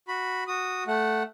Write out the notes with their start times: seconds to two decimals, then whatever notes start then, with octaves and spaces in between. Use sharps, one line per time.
0.08 F#4 B5
0.47 F#4 D#6
0.87 A3 F#5